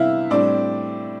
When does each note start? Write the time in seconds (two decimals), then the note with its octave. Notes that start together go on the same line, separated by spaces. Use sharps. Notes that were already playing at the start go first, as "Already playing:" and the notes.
Already playing: C3 E3 B3 E4 E5 F5
0.30 A2 G3 C4 D4 D5